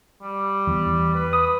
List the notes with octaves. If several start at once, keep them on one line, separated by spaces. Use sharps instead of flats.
G3
E2
B4
D#6